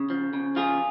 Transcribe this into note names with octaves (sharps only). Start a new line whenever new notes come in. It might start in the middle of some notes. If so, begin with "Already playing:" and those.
Already playing: C#3
F3
C#3
F3 F4 G#4